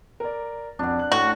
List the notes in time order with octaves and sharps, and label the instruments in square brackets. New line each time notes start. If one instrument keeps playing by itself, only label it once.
[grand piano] A#4 D5
[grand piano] F2 [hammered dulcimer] D4 F#5
[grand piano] F#6
[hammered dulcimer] A2 [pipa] F#4 [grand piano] F#6